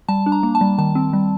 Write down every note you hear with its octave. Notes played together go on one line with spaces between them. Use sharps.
G3 A5
D4
A#5
A#3
A5
G3
D#3 A5
C4
G3